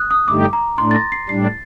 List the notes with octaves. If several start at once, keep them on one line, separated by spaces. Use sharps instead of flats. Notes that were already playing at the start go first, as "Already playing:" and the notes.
Already playing: D#6 F#6
D#6
G2 D3 A3 D#4 G4 D6
A#5
A2 A3 D4 C6
A6
A#6
C7
A2 G3 D4 C7
A6